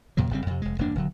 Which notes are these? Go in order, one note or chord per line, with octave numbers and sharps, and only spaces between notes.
E2 A#2 C#3 F#3
G1 C#3 G3 C4
F2 C3
F1 G#3
E1 G2 A#3 D4
D#1 D3 F#3